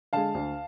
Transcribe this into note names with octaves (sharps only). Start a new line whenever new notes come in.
D3 G#3 F5 A5
D2